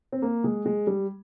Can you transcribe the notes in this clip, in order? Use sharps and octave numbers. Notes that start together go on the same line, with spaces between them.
C4
A#3
G#3
G#3
G3